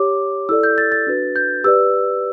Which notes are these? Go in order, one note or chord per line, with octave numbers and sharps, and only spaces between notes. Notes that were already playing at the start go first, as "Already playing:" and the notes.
Already playing: G4 C#5 D6
E4 A4 D5 E6
G6
A6
A6
D4 F#4 B4
G6
G4 B4 D5 E6